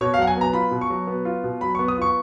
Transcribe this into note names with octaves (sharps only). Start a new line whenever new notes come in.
B2 C#5
F5
F#3 F#5
G#5
B3 A#5
F4 B5
B2
C#6
F#3
B3
F4
B2
F#3 B5
B3 C#6
D#6
F4 C#6